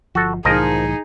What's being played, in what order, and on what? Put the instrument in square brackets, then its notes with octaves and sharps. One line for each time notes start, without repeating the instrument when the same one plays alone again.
[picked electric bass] G1 F3 [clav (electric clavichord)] F#4 A4
[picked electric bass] C2 A2 E3 [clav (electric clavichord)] F3 A#4 D#5 [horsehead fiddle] D#4 G#4